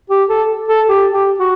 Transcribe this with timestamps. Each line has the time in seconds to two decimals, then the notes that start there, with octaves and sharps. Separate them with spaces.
0.10 G4
0.30 A4
0.68 A4
0.88 G4
1.13 G4
1.39 F#4